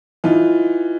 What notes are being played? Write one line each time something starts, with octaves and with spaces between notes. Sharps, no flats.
E3 D#4 F4